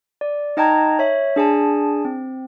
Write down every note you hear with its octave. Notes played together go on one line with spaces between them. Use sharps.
D5
D#4 D#5 G5 A5 A#5 G#6
C#5 E5
D4 G#4 G#5 A5
C4